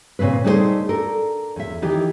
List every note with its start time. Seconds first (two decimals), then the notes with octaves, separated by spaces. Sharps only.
0.19 A#2 C#3 C4 B4
0.44 G3 A3 D#4 G#4 A#4 C5
0.89 D4 A4 A#4
1.56 E2 E5
1.82 D#3 E3 G4